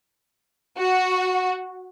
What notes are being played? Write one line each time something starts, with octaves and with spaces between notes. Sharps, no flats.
F#4